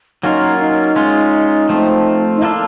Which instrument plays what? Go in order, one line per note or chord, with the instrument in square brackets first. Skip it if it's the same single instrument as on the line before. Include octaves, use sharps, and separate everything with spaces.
[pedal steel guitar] F#3 A#3 C#4 F4 A#4 [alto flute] D#4
[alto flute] D#4
[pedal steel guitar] G#3 C#4 F4
F3 A3 C4
[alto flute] D#4
[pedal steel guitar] A#3 D4 F4 A4 [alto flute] E4